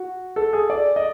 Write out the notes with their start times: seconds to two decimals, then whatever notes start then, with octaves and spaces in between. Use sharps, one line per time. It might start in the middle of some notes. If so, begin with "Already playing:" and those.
Already playing: F#4
0.36 A4
0.53 G#4
0.70 D5
0.96 D#5